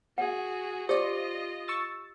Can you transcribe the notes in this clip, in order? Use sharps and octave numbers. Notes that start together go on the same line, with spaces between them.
F#4 G#4 F#5
F4 G4 C5 D5 D#5
C#6 E6 A6